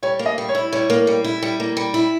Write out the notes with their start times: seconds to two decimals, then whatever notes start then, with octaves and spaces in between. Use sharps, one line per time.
0.03 G3 C#5
0.19 A#3
0.26 D#5
0.38 G3
0.49 C#5
0.55 E4
0.72 G3 C#5
0.90 A#3
1.07 G3
1.24 E4
1.43 G3
1.60 A#3
1.77 G3
1.94 E4